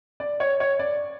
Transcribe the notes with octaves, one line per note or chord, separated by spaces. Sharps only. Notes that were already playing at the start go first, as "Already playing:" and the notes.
D5
C#5
C#5
D5